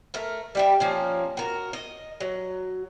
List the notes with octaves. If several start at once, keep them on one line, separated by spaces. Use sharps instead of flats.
A3 A#4
G3 G4 E5
F3 A#3 C#4
F#4 A#4
D#5
F#3